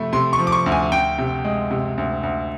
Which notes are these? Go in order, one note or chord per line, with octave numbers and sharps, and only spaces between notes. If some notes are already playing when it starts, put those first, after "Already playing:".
Already playing: C3 F3 A3 B5
C3 C6
C#6
F3
D6
C#6
D2
G#5
D2 G5
C3
G#3
C3
D2
D2